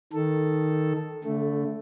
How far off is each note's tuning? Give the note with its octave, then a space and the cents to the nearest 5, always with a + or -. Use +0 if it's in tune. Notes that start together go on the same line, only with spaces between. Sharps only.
D#3 +5 A4 +0
D3 -35 A3 +0